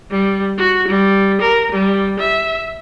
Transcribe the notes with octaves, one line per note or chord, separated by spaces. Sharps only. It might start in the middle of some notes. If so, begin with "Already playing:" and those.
G3
F#4
G3
A#4
G3
E5